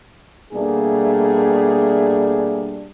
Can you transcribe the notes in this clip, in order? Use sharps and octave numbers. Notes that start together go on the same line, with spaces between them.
B2 G3 A3 A#3 D4 G#4